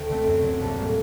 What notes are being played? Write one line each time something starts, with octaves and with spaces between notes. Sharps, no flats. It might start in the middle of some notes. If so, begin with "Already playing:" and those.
Already playing: D2 G5
D3 A3 C4
F#2
D3 F#3 C4
A#1 A5
A2 G3 A#3